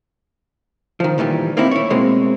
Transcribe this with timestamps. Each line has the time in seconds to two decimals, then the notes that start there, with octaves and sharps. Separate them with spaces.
1.00 D#3 F3
1.18 A#2 D#3 E3 G3
1.57 A#3 C4 D#4 E4
1.71 E4 C#5
1.90 B2 G#3 A#3 C4